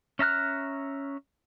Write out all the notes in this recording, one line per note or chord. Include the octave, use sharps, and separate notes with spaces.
C#4 E5 A#5 F6 F#6